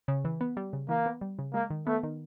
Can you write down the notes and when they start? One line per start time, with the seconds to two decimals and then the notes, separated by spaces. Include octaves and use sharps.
0.08 C#3
0.25 E3
0.41 B3
0.57 G3
0.73 C#3
0.89 E3 A#3
1.06 B3
1.21 G3
1.39 C#3
1.54 G#3 A#3
1.70 D#3
1.87 A3 B3
2.03 D#3